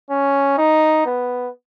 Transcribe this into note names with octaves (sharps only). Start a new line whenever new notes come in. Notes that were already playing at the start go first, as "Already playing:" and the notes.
C#4
D#4
B3